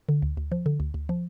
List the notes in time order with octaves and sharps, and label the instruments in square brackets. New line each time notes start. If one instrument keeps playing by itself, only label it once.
[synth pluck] D3
D2
D2
F3
D3
D2
D2
F3